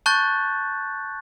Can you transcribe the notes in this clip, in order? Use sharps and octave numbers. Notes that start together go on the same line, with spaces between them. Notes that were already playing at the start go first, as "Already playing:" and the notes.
A5 C#6 F#6 G6 A6